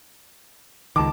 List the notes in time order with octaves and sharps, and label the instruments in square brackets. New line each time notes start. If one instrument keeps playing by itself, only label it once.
[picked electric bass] C#2 D#3 [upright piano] A5 D6